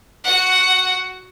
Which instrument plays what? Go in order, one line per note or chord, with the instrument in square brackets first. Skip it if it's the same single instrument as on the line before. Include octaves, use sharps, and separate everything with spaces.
[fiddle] F#4 F#5